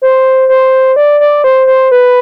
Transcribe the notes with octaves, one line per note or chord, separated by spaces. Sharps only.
C5
C5
D5
D5
C5
C5
B4